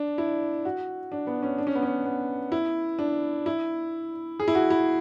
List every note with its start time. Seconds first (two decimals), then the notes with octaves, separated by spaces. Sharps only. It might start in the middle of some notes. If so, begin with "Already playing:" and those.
Already playing: D4
0.18 E4
0.65 F#4
1.12 D4
1.27 B3
1.43 C#4
1.58 D4
1.67 C#4
1.75 B3
1.83 C#4
2.06 B3
2.52 E4
2.99 D4
3.46 E4
4.40 G#4
4.48 E4
4.55 F#4
4.70 E4